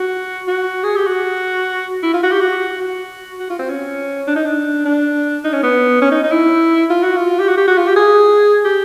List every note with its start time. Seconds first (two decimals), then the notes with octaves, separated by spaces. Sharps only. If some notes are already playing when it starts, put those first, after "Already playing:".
Already playing: F#4
0.48 F#4
0.84 G#4
0.96 G4
1.07 F#4
2.03 E4
2.14 F4
2.23 F#4
2.32 G4
2.40 F#4
2.81 F#4
3.39 F#4
3.50 F4
3.59 C4
3.69 C#4
4.27 D4
4.36 D#4
4.45 D4
4.85 D4
5.44 D#4
5.53 C#4
5.63 B3
6.02 C#4
6.11 D#4
6.24 D#4
6.32 E4
6.90 F4
7.03 F#4
7.17 F4
7.40 G4
7.48 F#4
7.58 G4
7.68 F#4
7.77 F4
7.87 G4
7.96 G#4
8.65 G4